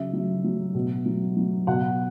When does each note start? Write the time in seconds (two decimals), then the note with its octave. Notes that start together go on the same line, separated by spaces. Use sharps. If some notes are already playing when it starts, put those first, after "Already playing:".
Already playing: C#3 F#3 E5
0.13 F#3
0.44 F#3
0.75 B2
1.06 F#3
1.37 F#3
1.67 B2 F#5